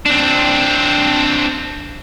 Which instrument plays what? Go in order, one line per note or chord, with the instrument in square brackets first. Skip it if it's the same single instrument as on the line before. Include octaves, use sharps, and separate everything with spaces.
[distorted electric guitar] C4 D4